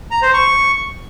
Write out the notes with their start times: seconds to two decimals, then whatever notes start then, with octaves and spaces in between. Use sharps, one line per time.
0.11 A#5
0.22 C5
0.34 C#6